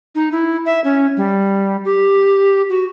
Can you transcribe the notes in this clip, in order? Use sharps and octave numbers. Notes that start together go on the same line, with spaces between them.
D#4
E4
E5
C#4
G3
G4
F#4